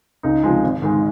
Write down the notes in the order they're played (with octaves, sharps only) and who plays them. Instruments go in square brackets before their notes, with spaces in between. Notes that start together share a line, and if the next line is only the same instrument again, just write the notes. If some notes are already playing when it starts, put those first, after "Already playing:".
[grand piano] C#2 D#4
C3 F3 G#3
G#1
G#2 D#3 G#3